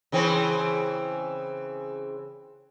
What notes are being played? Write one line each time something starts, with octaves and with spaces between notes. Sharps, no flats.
C#3 E3 C4